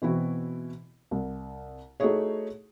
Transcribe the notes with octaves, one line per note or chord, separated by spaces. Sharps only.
B2 E3 C4 E4 F#4
C2
A3 D#4 E4 F#4 G#4 C#5